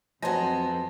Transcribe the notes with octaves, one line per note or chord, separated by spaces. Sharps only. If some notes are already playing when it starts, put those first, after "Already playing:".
F2 F#3 B3 C5 D#5 G#5 A5 A#6